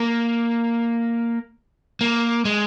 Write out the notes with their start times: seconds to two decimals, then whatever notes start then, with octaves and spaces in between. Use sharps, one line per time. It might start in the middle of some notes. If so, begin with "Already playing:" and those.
Already playing: A#3
2.01 A#3
2.45 G#3